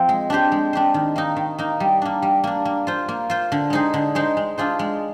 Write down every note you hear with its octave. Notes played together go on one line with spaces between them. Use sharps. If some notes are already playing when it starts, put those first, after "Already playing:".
Already playing: F3 C4
G#3
D4 G4 C5
G#3
D4 G4 C5
D#3
A#3 D#4
D#3
A#3 D#4
G3
A#3 D4
G3
A#3 D4
A#3
F4 C5
A#3
F4 C5
D3
G#3 D#4 G#4 C5
D3
G#3 D#4 G#4 C5
G#3
D4 F4 G#4 C5
G#3